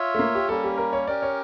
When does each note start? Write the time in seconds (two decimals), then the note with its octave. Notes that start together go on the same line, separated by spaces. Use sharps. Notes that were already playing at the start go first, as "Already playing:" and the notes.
Already playing: F4 C#5 E5
0.14 A3
0.19 A#3
0.35 G4
0.49 G3 A#3 C#4 A4
0.64 G4
0.78 A#4
0.93 C#5
1.07 C#4 G4 A#4 D5
1.22 C#5